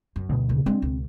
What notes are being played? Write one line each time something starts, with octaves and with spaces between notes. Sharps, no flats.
F#2
D2 B2
D#2 C#3
G#3 C4 D4
C#2 B2